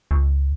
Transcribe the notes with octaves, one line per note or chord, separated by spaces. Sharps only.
C#2